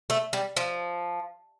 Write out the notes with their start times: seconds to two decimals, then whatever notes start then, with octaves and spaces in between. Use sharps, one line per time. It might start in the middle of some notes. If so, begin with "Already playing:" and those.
0.10 A3
0.33 G3
0.57 F3